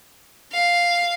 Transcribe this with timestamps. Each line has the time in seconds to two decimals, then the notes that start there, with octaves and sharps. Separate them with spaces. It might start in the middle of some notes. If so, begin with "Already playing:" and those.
0.52 F5